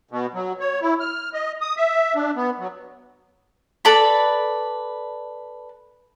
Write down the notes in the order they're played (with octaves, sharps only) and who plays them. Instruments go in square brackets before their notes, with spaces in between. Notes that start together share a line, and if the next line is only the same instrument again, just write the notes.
[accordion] B2
F#3
C#5
E4
F6
D#5
D#6
E5
D4
B3
F#3
[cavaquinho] A4 B4 D5 B5